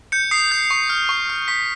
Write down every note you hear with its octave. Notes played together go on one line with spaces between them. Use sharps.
G6 C#7
D#6 C7
G6
C#6
F6
C#6
F6
C#6 B6